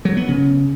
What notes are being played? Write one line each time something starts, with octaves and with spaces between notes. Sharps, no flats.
F#3
B3
C#3